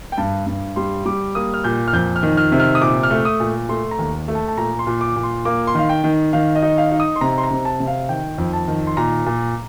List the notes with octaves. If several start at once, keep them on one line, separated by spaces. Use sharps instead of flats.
G5
G2 A5
G2
G3 C6
G3 D6
A#3 D#6
F6
A#2 G6
F6
F2 G6
F6
D#3
F6
C3
F6
D#6
A#2 D6
F6
A3
D#6
A#2
A3 C6
A#5
D#2
A3
A5
A5
A#2 A#5
C6
A#2
D6
A#2
C6
A#3 D6
C6
D#3 F5
G5
D#3
D#3 F5
D#5
D#4
F5
D#4
D#6
C6
C3 A#5
C6
A#5
C3
A5
C3
F5
D#3 G5
F2
A5
D#3
C6
A#2 A#5
A#2